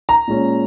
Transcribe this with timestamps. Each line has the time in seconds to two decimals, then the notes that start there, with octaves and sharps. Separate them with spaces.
0.09 A#5
0.28 A#2 G#3 C#4